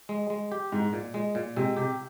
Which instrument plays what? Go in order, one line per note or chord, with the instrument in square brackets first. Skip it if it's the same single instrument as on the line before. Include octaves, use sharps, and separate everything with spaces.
[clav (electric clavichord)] G#3
G#3
G4
[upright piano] G#2 [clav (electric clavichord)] G#3
[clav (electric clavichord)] A#2
G#3
A#2
[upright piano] C3 [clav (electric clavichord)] G#3
[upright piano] C3 [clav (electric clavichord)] G4